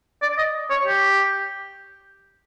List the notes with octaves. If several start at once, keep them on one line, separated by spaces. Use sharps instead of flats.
D5
D#5
C#5
G4